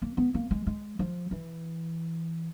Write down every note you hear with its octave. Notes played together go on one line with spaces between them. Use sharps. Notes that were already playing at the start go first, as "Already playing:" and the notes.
A#3
B3
A#3
G#3
G#3
F3
E3